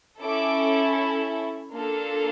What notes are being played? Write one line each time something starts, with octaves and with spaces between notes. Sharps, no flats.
C#4 E4 A4 D6
A#3 D4 F4 A4